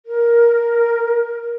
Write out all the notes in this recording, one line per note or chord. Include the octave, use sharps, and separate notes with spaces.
A#4